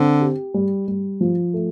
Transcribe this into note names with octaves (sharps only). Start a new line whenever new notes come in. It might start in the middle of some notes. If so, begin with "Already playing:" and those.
Already playing: D3 C4
G4
G3
G3
F3
A3